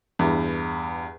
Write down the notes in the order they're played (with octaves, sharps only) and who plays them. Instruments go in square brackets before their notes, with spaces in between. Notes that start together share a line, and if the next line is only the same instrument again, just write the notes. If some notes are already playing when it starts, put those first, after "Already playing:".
[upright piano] E2 G2